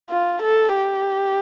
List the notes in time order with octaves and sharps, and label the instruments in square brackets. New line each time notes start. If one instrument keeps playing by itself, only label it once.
[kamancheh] F4
A4
G4